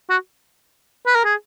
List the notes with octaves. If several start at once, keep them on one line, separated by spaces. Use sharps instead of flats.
F#4
B4
A#4
G#4